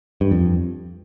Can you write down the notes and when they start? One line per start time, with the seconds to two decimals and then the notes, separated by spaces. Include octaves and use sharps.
0.21 G2
0.31 F2